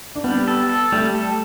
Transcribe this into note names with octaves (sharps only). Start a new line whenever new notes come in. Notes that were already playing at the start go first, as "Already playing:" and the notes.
D4
G3 B3
A4
A4
G3 A3
A4